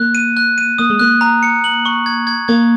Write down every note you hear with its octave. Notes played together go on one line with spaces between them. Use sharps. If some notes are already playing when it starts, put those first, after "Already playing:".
Already playing: A#3 F#6
D#7
F#6
D#7
A#3 D#6
G#3
A#3 F#6
A#5
C#7
F#7
C#6
G#6
G#6
A#3 G#6